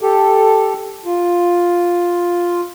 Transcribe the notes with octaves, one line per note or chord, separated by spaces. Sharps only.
G4 A4
F4